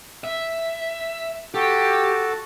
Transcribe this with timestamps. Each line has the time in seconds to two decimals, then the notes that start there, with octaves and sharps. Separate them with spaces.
0.24 E5
1.54 F#4 G4 A4